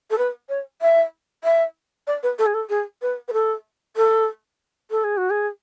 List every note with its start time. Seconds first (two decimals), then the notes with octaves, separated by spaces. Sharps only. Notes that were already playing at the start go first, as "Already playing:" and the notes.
0.11 A4
0.18 B4
0.49 C#5
0.82 E5
1.44 E5
2.07 D5
2.23 B4
2.39 A4
2.46 G#4
2.54 A4
2.69 G#4
3.02 B4
3.28 B4
3.33 A4
3.97 A4
4.91 A4
5.04 G#4
5.17 F#4
5.30 G#4